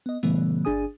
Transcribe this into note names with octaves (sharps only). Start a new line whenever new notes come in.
B3 D#5
A#2 C#3 E3 G3 A3 B3
G1 D4 G#4 G#5 D#6